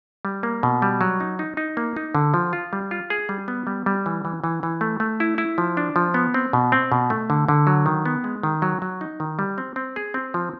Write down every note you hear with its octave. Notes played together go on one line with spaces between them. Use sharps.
G3
A#3
B2
G3
F#3
D#4
D#4
D#4
A#3
D#4
D3
F3
F4
G3
F4
G#4
G3
B3
G3
G3
E3
E3
E3
E3
A3
A3
E4
E4
F3
D4
F3
B3
C4
B2
C4
B2
A3
D3
D3
F#3
D#3
B3
G#3
D#3
F#3
F#3
D#4
D#3
G3
C4
C4
G#4
C4
F3